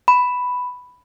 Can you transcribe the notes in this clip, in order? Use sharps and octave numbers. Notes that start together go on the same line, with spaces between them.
B5